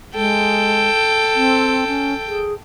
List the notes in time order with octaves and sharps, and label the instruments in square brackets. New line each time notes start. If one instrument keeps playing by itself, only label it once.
[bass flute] G#3 [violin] A4 G5
[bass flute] C4
C#4
G#4